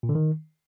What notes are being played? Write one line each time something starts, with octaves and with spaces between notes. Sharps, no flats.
A#2
D3
D#3